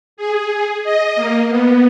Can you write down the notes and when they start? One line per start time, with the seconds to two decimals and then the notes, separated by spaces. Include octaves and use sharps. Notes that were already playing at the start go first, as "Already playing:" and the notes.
0.17 G#4
0.84 D#5
1.16 A#3
1.49 B3